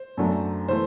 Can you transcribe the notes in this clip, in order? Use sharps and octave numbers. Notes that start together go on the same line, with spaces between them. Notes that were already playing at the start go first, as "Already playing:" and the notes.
Already playing: C5
F#2 F#3 A3 D4
E3 A3 C5